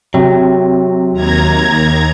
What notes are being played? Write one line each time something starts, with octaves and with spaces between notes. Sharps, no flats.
C3 F#3
D#2 A#5 G#6